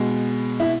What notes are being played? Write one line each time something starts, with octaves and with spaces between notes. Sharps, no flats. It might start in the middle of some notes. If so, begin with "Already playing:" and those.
Already playing: B2 G#3
E4